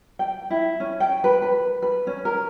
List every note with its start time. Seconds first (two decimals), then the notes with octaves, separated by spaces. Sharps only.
0.19 G5
0.50 E4
0.80 C#4
1.00 G5
1.24 B4
1.42 B4
1.82 B4
2.07 C#4
2.25 A#4